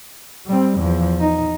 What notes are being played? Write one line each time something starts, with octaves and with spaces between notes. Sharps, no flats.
G3 C4
E2 F3
D#4